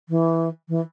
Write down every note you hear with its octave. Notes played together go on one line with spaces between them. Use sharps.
E3
E3